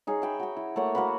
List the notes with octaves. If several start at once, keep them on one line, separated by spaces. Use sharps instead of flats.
D#4 G#4 C#5 F5
E5 G5 B5
F#4 G5
E4
A3 A#3 C#5 F#5
A#3 F#4 B4